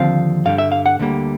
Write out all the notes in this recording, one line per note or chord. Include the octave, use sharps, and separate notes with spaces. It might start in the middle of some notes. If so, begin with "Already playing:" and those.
Already playing: D#2 D3 F3 C4 F5
G2 D3 G3 F5
E5
F5
F#5
D2 D3 G3 A#3